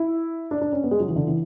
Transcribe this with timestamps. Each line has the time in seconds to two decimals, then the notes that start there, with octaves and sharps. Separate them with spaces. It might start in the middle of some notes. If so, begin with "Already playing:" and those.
Already playing: E4
0.51 D4
0.61 D4
0.73 C#4
0.84 B3
0.91 G#3
1.00 F#3
1.08 E3
1.16 D3
1.27 E3